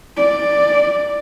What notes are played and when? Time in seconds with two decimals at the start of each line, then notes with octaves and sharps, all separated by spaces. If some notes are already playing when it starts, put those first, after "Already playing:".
0.17 D5